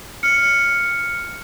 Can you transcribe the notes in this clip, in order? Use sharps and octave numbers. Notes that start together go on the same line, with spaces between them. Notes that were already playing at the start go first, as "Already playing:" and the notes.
F6 C#7